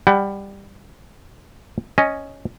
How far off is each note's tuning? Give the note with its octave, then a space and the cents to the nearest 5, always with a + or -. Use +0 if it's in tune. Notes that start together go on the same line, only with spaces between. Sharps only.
G3 +15 F#5 +35
C#4 +0 D#5 +0